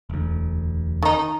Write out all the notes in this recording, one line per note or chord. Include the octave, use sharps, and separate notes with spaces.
E1 D2
D#3 D#4